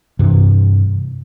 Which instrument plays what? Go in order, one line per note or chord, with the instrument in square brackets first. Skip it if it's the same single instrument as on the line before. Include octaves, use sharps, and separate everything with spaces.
[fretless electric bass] G2 C3 E3